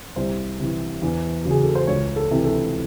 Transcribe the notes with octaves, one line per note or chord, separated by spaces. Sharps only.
C2 C5
C3 E3
E2
C#3 F#3
G#4
A4
C5
C#2 C#5
A4
C3 E3
A4